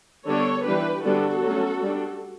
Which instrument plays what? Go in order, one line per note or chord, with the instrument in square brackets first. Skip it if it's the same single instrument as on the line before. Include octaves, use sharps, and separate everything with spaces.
[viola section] D3 G3 B3 D4 A4 C#5
E3 G3 D4 G4 B4
D3 G3 B3 D4 F#4 A4
F#3 A3 C#4
G3 D4